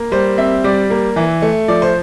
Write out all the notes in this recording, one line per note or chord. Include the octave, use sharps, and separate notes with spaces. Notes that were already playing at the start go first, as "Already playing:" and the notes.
Already playing: A#3
G3 C5
C4 E5
G3 D5
A#3
E3
A3
F3 D5
C5